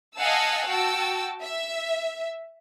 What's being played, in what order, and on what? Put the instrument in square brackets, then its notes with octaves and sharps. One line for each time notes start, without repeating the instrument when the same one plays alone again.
[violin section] D#5 F5 F#5 G#5 A5 E6
F#4 G5 A5 E6
E5